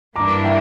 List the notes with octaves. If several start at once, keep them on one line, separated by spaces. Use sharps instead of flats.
G2 E3 A#3 D4 A#5 D6
E5 G5